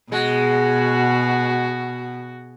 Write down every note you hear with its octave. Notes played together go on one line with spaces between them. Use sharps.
B2 G#3 F#4